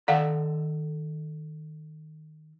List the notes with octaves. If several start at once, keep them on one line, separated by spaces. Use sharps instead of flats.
D#3 A4 D5 F5 F#5 A#5